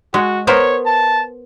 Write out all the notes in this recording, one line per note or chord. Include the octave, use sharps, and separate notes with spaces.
G#3 F#4
B3 A#4 C5 C#5
A5